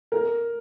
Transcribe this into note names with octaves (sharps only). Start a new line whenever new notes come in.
A#4